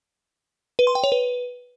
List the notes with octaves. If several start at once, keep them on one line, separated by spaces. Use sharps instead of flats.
B4
C6
G5
C#5
B4